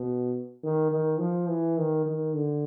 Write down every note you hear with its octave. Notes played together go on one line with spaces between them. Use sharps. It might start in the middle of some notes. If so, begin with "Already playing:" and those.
Already playing: B2
D#3
D#3
F3
E3
D#3
D#3
D3